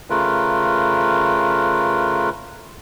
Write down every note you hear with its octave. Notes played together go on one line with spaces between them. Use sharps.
C#3 A3 F4 A#4 B4